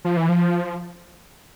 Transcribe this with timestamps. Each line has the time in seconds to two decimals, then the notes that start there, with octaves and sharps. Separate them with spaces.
0.04 F3
0.17 E3
0.29 F3